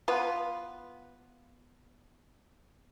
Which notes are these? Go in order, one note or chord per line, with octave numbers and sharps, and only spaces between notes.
B3 F4 B4